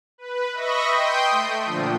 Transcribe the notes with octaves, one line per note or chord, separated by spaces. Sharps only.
B4
D#5 E5 B5 C#6 A#6
G5 C6 D#6 G6
A3
A#2 D3 F3